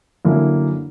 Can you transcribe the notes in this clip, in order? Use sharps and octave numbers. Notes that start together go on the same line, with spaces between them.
F#2 D3 A#3 E4